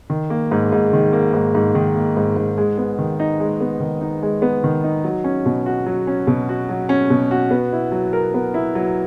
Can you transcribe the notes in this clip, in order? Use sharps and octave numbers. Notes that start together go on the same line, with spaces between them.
D#3
A#3
G#2
G#2
D#3
A#3
G#2
G#2
D#3
A#3
G#2
G#2
G#3
B3
D#3
D#4
G#3
B3
D#3
D#4
G#3
B3
D#3
D#4
F#3
C#4
B2
F#4
F#3
C#4
B2
F#4
F#3
C#4
B2
F#4
B3
E4
F#3
A#4
B3
E4
F#3